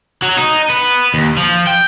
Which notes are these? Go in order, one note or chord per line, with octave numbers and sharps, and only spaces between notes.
F#3
D#4
B3
D#2
F3
G5